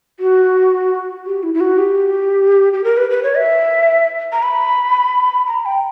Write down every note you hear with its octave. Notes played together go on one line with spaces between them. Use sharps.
F#4
G4
E4
E4
F#4
G4
G4
A#4
B4
B4
C#5
E5
A#5
B5
A#5
G5